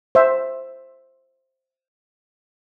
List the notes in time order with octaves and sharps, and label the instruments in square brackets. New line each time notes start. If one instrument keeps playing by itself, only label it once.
[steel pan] C5 E5